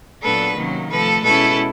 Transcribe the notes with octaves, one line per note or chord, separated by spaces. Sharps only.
A#2 F#3 B3 D4 A4 B4
C3 D#3 F#3 A#3 C#4
C3 F3 A3 A4 B4
B2 G#3 C#4 E4 A4 B4